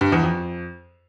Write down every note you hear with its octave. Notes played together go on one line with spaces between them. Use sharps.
G2
E2
F2